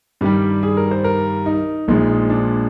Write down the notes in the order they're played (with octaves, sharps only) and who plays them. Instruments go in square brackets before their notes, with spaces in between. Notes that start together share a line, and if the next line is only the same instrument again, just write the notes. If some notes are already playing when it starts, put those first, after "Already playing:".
[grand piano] G2 D#3 G3 G4
G#4
A#4
C5
A#4
D#4
A#1 A#2 F3 G#3 D#4
D4